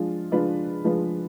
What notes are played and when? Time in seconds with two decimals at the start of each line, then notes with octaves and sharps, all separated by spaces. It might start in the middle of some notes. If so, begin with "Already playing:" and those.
Already playing: F3 G#3 D4 F4
0.32 F3 G#3 D4 F4 B4
0.84 F3 G#3 D4 F4 B4